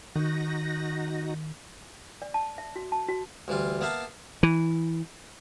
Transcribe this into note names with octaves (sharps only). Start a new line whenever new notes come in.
D#3 D#4 F#4 A#6
D5
A5
E5
F#4
A5
F#4
D2 E3 G3 F4
A#3 B3 E5 F5 A5
E3